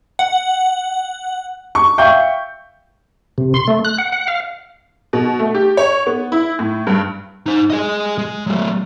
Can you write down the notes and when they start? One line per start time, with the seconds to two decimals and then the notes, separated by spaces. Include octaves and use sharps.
0.19 F#5
1.75 C#6
1.98 E5 F5 G5 C#6 G6
3.38 C3
3.54 C6
3.68 A3
3.85 F#6
3.99 F#5
4.12 F#5
4.28 F5
5.13 B2
5.39 A3
5.55 G4
5.77 C#5
6.06 B3
6.32 E4
6.59 A2
6.87 G2
7.46 D#4 C5
7.70 G#4 D#5
8.18 G#3
8.47 F#3 A3